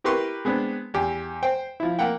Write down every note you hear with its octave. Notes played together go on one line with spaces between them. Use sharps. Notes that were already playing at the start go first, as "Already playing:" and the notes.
E4 G4 A#4 B4 C6 C#6
G#3 B3 C4 D4
E2 G4
C5 G5
F3 E4
A#3 F#5 G5